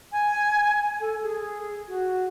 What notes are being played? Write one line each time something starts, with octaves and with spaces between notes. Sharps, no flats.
G#5
A4
G#4
F#4